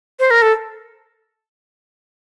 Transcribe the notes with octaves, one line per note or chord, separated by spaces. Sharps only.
C5
A#4
A4